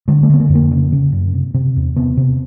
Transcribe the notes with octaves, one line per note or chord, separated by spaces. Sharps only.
D3 G#3
A3
D3 B3
A#3
F2
A#3
C#3
C#3
F#2
C3
C3
E2
C3 B3
C3